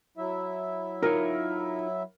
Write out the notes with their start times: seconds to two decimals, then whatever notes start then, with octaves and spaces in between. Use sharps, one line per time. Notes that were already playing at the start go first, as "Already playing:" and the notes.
0.17 F#3 E4 E5
1.03 D#4 F4 A#4 C#5